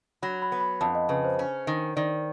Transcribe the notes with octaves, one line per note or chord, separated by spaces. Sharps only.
F#3 B5
B5
B3
B5
F2 A5
D#5
C#3 B4
C5
C#4
D#3
D#3 D5